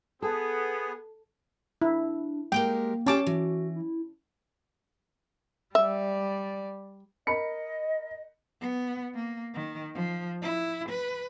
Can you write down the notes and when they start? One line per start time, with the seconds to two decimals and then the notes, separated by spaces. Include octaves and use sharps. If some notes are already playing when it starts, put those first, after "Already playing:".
0.22 B3 G#4 A4
1.82 D4 E4
2.52 G#3 A#3 G4 A#4 G5
3.06 C#4 F4 G4 A4 A5 D6
3.26 E3 F#4
3.76 E4
5.75 G3 D5 E5
7.27 A#4 D#5 B5 C#7
8.61 B3
9.14 A#3
9.54 D#3
9.94 F3
10.42 E4
10.89 B4